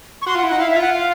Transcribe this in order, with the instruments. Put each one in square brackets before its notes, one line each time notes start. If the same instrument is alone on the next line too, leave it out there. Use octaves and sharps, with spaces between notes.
[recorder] C#6
[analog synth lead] F#4 [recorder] C6
[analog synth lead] F4 [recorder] F#5
[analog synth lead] E4
[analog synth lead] D#4 [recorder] F#5
[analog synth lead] E4 [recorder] F5
[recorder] E5
[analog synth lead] F4
[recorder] F#5
F5